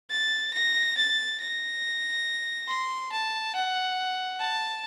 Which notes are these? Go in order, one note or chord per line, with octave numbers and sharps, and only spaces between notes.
A6
A#6
A6
A#6
C6
A5
F#5
A5